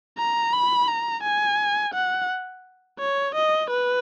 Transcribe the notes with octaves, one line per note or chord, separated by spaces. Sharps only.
A#5
B5
A#5
G#5
F#5
C#5
D#5
B4